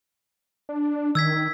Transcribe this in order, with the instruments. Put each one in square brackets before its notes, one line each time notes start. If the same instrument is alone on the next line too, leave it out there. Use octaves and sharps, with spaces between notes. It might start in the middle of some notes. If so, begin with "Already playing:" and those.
[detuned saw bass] D4
[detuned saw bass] D#3 [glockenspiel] E6 G#6 B6